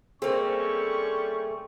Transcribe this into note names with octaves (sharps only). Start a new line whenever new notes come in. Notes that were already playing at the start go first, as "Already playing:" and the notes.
G3 A3 A#3 C4 C#4 G#4 A#4 C#6